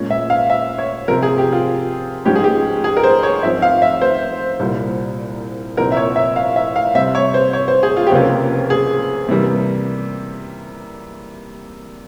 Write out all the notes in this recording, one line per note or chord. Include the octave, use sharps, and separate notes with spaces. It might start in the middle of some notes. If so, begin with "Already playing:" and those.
Already playing: A#2 G#3 C#4
E5
F5
E5
C#5
C3 F3 C4 A#4
G#4
G4
F4
G#2 F3 G#3 C#4 G4
G#4
G4
G#4
A#4
C5
C#5
G#2 F3 C4 E5
F5
E5
C5
C2 A#2 G3
C2 A#2 F3 C4 A#4
E5
C#5
E5
F5
E5
F5
C3 G3 C4 E5
C#5
C5
C#5
C5
G#4
F4
G4
C#2 C3 F3 A#3 C#4 F4
G#4
C3 E3 G3 A#3